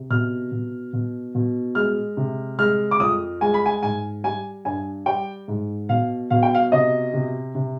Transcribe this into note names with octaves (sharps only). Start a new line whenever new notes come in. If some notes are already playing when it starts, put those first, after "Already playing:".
Already playing: C3
B2 F6
B2
B2
B2
G#3 F6
C3
G#3 F6
D6
F2 D#6
G#3 G#5
B5
G#5
G#2 G#5
G3 G#5
G2 G#5
G3 G5
G#2
B2 F5
B2 F5
G5
F5
C3 D#5
C3
C3